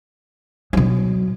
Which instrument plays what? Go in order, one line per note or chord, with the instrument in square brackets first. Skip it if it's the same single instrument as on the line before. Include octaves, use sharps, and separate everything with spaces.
[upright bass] B2 F#3